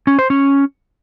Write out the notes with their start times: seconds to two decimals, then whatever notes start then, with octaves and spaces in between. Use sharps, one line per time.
0.07 C#4
0.19 C5
0.30 C#4